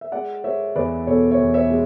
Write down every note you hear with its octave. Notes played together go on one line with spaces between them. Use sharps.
E5
G#3 D5 F#5
G#3 C#5 E5
E2 B4 D5
B2 A4 C#5
C#5 E5
E2
C#5 E5
G#3